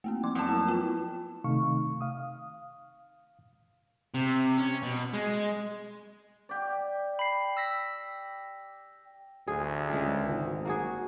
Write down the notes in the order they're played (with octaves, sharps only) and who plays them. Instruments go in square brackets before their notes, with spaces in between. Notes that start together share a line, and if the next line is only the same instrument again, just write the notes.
[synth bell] A3 A#3 C4
F3 C6 D6
[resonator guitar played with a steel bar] F#2 A5
[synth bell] E4
B3 F4 G5
[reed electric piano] C3 D#3 A3 D#4 F5 C#6
F5 D#6
[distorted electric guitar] C3
C#4
B2
G#3
[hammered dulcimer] G4 D5
[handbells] B5 C7
E6 A#6 B6
[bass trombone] D2 [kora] G#4
[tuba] C#2 [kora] G#3 G#4
[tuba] G#1
[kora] A#3 F#4 G#4